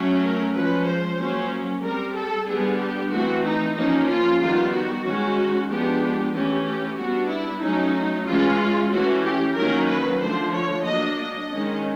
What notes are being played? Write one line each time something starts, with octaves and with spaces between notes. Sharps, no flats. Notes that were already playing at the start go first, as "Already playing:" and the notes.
Already playing: F#3 A3 C#4
A#4
F3 G#3 C#4 B4
C5
F#3 A#3 C#4
G3 C4 A#4
A4
D3 G3 B3 D4 G#4
G4
E3 A3 C4 F#4
D#4
F3 A#3 C#4 D#4
F4
D#3 G3 B3 F4
F#4
D#3 G#3 C#4
F3 G#3 B3 D4 G4
E3 A3 C#4 G4
G4
G3 B3 D4 F#4
E4
F#3 A3 C#4 D#4
E3 G#3 C#4 F4
E3 A3 C#4 F#4
G4
D#3 F#3 A#3 C#4 A#4
B4
D3 F3 A3 C5
C#5
F#3 A#3 D4 D#5
D#5
D#3 G#3 C#4